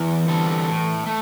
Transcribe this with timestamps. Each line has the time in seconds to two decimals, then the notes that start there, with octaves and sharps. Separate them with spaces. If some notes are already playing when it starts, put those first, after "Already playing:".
Already playing: E2 E3
0.28 D3 G3 C4 A4
0.68 A2
1.06 A3